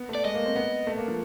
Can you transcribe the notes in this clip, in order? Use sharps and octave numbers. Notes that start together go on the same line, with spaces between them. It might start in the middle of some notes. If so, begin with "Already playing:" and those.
Already playing: B3
A3
D5
G#3 D#5
A#3
C4
B3
A3
A#3
F3